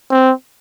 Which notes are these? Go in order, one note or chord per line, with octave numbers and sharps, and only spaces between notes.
C4